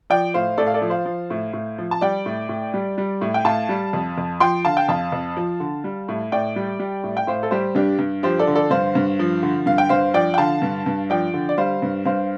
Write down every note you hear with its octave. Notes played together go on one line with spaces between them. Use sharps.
F3 D5 G5
A2 C5 F5
A2 A4 D5
F5
A4 D5
F3
C5 F5
F3
A2
A2
F3
A5
G3 D5 G5
A2
A2
G3
G3
A2
G5
A2 F5 A5
G3
F2
F2
F3 G5 C6
D3 F5 A5
G5
F2 F5 A5
F2
F3
D3
G3
A2
A2 D5 G5
G3
G3
A2
G5
A2 C5 F5
A4
G3 G4 C5
G2 D4 G4
G2
F3 G4 C5
A4 D5
D3
A4 D5
G2 C5 F5
G2
F3
D3
G2 F5
G5
G2 C5 F5
F3 D5 G5
G5
D3 F5 A5
G2
G2
F3 D5 G5
D3
D5
G3 C5 F5
G2
G2 C5 F5